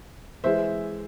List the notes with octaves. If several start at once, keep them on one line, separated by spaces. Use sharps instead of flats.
E3 G#3 C5 E5